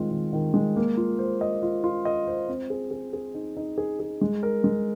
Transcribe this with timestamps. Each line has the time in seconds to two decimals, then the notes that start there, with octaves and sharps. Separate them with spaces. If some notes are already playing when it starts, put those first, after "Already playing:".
Already playing: D#3 G#3 C4 F4
0.11 D#3
0.33 D#3
0.54 G#3
0.76 A#3
0.97 F4
1.19 C5
1.41 D#5
1.62 F4
1.84 F4
2.05 D#5
2.27 C5
2.49 C4
2.70 G#4
2.91 G#4
3.13 G#4
3.35 D#4
3.57 D#4
3.78 G#4
4.00 G#4
4.21 G#3
4.43 A#4
4.64 G#3